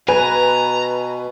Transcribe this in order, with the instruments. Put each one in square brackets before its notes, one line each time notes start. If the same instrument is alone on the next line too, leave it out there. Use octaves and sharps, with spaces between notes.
[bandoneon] B2 [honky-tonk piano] B4 G#5 [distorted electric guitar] A#5